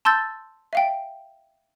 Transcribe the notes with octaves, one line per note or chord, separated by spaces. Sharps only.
A5 C6 E6 G6 A6
E5 F5 G5